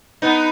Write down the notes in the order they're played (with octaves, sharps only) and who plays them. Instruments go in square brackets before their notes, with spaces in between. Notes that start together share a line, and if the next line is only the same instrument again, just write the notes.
[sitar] B3 D#4